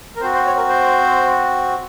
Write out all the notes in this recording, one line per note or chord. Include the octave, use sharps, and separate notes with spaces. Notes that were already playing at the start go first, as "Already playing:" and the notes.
A#4
C4 F#4 C5
C5
C#5
A#4
C5